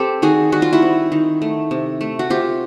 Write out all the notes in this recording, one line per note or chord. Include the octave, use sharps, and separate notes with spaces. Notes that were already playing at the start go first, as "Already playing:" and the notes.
Already playing: C4 G4 A4
D#3 F#4 G#4
G3 F#4
F4
E4 F#4
C4
D#3
A3
C3
A3
F#4
C3 F4 G4